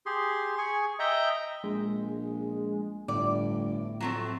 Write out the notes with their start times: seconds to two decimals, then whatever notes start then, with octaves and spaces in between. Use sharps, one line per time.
0.06 G4 G#4 C6
0.58 G#4 G#5 C#6
0.99 D#5 E5 G5 A#5
1.64 A#1 G#3
3.08 G1 A2 D5
4.00 F2 F#3 A3 C4